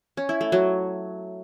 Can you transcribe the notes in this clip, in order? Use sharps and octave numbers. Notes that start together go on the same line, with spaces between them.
C#4
E4
A3
F#3